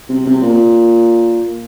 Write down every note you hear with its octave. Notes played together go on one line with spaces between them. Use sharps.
C3
C3
A#2